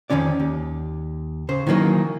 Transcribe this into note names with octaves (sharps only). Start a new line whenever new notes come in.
F2 D#3 F3 C#4 D5
D#2
C#3 C5
D#3 E3 F#3 A#3 D#4